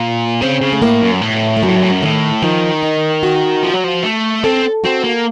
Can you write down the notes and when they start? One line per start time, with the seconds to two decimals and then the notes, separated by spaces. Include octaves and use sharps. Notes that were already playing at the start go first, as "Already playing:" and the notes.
Already playing: A#2
0.42 C#3 C4
0.61 C#3
0.73 A3
0.82 A2 A#3
1.02 F#2
1.21 A2
1.57 A3
1.63 F#2 F#3
1.69 A2
1.76 F#2
1.83 A2
1.91 F#2
2.02 A2 D#3
2.42 D#3 F3
2.83 D#4
3.23 F#4
3.63 F3
3.74 F#3
3.84 F3
4.03 A3
4.44 C4 A4
4.84 C4 F#4
5.04 A#3